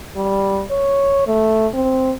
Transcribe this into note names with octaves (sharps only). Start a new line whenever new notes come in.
G3
C#5
A3
C4